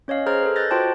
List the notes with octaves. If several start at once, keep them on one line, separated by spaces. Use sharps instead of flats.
C#4 C#5 D#5 F5
G#4 C5 A#5 F6 G#6
A4 B4
D#5 F#6 G6 A6 A#6
F4 F#4 C5 G5 A5 D6